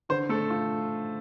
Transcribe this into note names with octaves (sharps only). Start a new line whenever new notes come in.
D3 C5
A3 A4
F4